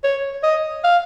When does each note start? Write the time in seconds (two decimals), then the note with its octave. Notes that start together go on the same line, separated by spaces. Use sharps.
0.04 C#5
0.43 D#5
0.84 F5